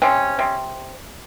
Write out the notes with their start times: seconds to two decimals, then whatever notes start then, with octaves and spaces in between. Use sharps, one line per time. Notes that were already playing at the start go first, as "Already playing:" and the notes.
0.02 C3 C#4
0.39 C3